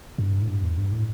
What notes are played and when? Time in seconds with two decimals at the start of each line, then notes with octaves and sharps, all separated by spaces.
0.18 G2
0.42 A2
0.48 G2
0.63 E2
0.77 G2
0.92 A2